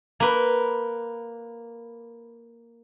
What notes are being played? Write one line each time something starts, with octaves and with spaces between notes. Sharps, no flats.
A#3 B4